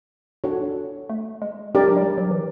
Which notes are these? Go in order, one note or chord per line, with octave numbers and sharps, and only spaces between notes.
D4 F#4 A4 C#5 F#5
A3
G#3
G#3 D4 G4 A#4 D5
F#3
G3
F#3
E3